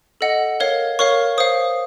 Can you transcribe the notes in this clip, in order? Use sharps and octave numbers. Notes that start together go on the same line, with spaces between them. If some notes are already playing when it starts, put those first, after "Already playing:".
A4 D#5 F#5
A#4 C#5 F5
A#4 C#5 F5 C#6
C5 F5 D#6